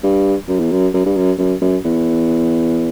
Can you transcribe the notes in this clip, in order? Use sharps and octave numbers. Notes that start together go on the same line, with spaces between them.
G2
F#2
E2
F#2
F#2
G2
F#2
F#2
F#2
E2